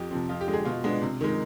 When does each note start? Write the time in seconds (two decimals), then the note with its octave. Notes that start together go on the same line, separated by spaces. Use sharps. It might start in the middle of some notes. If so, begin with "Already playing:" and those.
Already playing: F2 G4
0.11 C3 F3 C4
0.29 F2 F4
0.41 G4
0.47 D3 G#3
0.53 G#4
0.65 B2 F4
0.84 G#3 B3 D4
1.02 C3
1.21 D#3 G#3